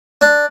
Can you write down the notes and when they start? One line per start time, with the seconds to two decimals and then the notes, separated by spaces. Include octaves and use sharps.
0.21 D4